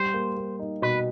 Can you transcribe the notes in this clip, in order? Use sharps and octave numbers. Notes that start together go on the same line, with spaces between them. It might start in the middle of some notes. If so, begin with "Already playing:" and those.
Already playing: G3 C5
A#3
A#3
D#4
B2 B4